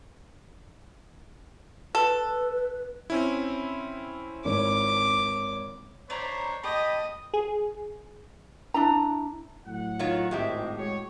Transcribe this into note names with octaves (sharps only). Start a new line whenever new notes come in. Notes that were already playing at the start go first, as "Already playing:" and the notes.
A4 B4
C4 C#4 E4
G#1 C#5 D6
D4 C5 C#5 A#5 B5
G4 D#5 A5 B5 D#6
G#4
D4 E4 A#5
A2 F#3 F#5
D#3 F4 C#5
G#1 A2 G#3 G4 E5
G#3 F#4 C#5